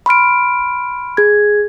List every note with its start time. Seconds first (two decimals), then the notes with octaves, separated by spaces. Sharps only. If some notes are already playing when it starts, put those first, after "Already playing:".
0.06 B5 C6 F6 D7
1.17 G#4 G#6